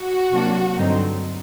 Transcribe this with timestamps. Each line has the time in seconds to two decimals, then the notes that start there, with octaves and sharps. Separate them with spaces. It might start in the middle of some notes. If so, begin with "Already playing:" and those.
Already playing: F#4
0.32 C3 F#3 A#3 D4
0.78 G2 D3 F#3 C4 D#4